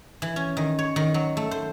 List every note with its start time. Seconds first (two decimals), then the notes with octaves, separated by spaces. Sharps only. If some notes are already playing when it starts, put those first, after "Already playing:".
0.22 E3
0.36 C#4
0.57 D#3
0.79 C#5
0.96 D#3
1.14 F#3
1.37 A3
1.51 C5